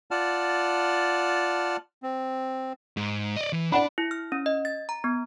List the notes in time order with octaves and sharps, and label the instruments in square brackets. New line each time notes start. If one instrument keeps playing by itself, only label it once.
[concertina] F4 D5 F#5 A5 F6
C4
[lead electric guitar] G#2
D5 D#5
E3
[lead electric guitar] D4 [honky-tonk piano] D5 F#5 B5
[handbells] E4
F6
C#4
D#5
A6
A#5
B3